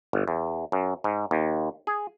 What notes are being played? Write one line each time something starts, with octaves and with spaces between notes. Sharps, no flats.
G1
E2
F#2
G#2
D#2
G#4